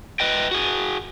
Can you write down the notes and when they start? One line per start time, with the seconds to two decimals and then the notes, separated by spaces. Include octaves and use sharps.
0.20 B4 D#5 G5
0.51 F#4 G#4